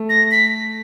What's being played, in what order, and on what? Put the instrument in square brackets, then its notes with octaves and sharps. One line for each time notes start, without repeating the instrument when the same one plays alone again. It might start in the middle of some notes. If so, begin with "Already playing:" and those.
Already playing: [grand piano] A3
[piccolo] A#6
B6